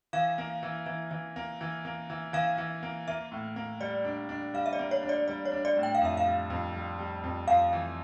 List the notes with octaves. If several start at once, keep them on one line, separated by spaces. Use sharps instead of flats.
E3 F5
A#3
E3
E3
E3
A#3
E3
A#3
E3
E3 F5
E3
A#3
A#3 E5
A2
A#3
G3 D5
D4
D4
G3 F5
E5
D5
A#3
C#5
D4
D5
G3 D5
C#5
D4
D5
A2
G5
F5
F2 E5
F5
G3
F2
G3
G3
F2
F2 F5
E3